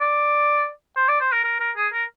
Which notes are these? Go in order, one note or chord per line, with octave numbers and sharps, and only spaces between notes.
D5
C5
D5
C5
A#4
A#4
A#4
G#4
A#4